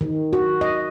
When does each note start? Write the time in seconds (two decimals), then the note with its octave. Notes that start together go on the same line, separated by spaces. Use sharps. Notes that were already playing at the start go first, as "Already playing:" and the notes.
0.01 D#3
0.33 F#4
0.61 D#5